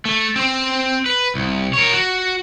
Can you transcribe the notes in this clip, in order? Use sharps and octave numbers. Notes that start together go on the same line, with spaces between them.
A3
C4 C5
B4
C2
A#4 C#5
F#4